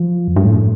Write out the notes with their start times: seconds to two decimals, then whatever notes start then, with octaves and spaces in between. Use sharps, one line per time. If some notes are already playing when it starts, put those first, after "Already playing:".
Already playing: F3
0.28 F2
0.36 G2
0.45 A2